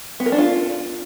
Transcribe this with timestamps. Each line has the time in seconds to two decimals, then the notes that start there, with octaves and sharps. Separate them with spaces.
0.20 B3
0.26 A#4
0.32 D4
0.38 F4